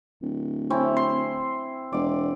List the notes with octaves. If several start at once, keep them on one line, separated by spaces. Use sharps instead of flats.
D1
C4 C#4 E4
C6
E1 D5